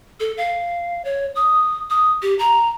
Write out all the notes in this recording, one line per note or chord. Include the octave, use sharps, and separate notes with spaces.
A4
F5
C#5
D#6
D#6
G4
A#5